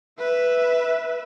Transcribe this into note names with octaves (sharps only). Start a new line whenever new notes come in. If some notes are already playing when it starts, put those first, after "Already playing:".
B4 E5